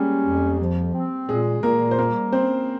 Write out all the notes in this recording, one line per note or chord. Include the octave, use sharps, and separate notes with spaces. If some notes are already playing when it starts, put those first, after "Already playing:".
Already playing: G3 G#3 A#3 C#4 G4 G#4
F2
F3
C4
A#2 G#3 G#4
A#2 A#3 A#4
C5
G3 A#3 A#4
C4 C#4 C5